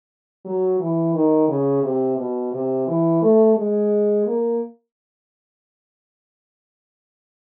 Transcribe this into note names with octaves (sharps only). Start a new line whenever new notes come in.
F#3
E3
D#3
C#3
C3
B2
C3
E3
A3
G#3
A#3